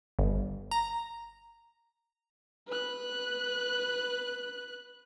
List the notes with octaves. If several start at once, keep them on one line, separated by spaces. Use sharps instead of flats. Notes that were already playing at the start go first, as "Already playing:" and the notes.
G1
A#5
B4 F#6